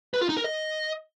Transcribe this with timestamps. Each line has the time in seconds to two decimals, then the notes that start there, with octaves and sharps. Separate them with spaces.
0.14 B4
0.21 F4
0.29 D#4
0.37 A#4
0.44 D#5